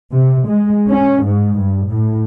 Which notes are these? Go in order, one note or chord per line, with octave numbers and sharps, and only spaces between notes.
C3
G#3
C#4
G#2
G2
A2